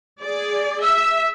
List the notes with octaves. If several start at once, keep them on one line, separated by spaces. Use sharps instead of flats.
G#4 D5
E5 E6